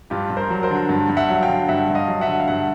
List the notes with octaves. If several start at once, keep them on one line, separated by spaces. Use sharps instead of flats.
G2 F4 G4
G2
A#4 C5
F#3
A#4 C5
D3
G2
G2
E5 F#5
F#3
F5 G5
D3
G2 E5 F#5
G2
D#5 F5
F#3
E5 F#5
D3
F5
G2 E5 F#5